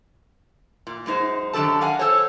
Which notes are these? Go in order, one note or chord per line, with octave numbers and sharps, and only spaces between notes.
A#2
F#2 G#3 D#4 C5
F#2 D#3 D4 G4 A4 A5
A#4 F5 F#5 G#5
A4 C5 C#5